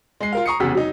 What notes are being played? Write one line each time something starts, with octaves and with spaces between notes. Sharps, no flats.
G#3 C7
F4 A#4 F5
A#5 C#6 D#6 C7 C#7
F1 E2 C#3 F#4 E6 B6
F#3 D#4